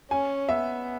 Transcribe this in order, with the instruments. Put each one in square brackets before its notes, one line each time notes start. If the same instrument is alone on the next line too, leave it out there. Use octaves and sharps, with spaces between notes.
[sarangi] C#4 [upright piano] G#5
[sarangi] B3 [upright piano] E5